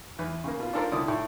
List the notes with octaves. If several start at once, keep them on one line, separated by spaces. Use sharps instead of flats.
E2 B4
C#3 A#3
B2 F4
D4 F4 A4 A#4 C5 D5
C2 D3 E4 D5 D#6
A2